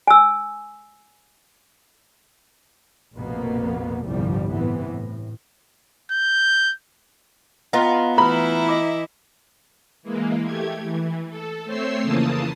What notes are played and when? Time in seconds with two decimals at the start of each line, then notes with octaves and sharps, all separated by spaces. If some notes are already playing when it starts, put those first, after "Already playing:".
0.07 G#5 E6
3.14 F1 A#1 F2 B2 A#3 B3
4.04 G1 C2 A2 F3 G3
4.52 A2 C3 E3 B3
4.85 A2
6.11 G6
7.73 B3 F4 D#5 F5 A#5
8.18 E3 A3 E4 B4 A#5 B5 F6
8.69 D#5 E5 D6
10.03 E3 G#3 A#3
10.44 A3 G4 G#6
10.83 E3
11.29 A4
11.65 A3 C4 C5 C#5 E6 C7
12.03 F2 C#3 E3 A#3 A5 D#6